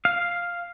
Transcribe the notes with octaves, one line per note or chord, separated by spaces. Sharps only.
F5